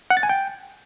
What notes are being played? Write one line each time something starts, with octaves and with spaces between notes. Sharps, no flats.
F#5
A6
G#5
G5